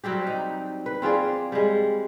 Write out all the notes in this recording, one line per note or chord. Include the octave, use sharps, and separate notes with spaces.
F#3 G3 C4 G4
D#4
B4
C4 F4 G#4 D5
G3 G#3